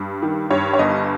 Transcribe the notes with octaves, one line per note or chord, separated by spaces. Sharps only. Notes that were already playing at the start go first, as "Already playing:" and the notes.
Already playing: G2
D#3
G2 C#5
C#5
G1 D#5